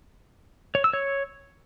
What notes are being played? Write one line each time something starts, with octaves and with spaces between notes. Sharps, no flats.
C#5
E6
C#5